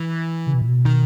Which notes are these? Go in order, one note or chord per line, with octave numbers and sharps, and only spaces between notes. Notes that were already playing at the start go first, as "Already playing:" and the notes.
Already playing: E3
C#3
B2
A#2
B2
D#3